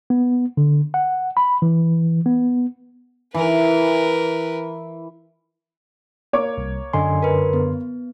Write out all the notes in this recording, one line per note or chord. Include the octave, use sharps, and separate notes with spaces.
B3
D3
F#5
B5
E3
B3
E3 A#4 B4
A#3 C#5 D6
C2
F#2 D3 D#5 G#5 C6
A#4 B4
B3